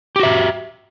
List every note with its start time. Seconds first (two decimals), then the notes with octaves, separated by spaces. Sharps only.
0.16 G4
0.20 F#4
0.23 E5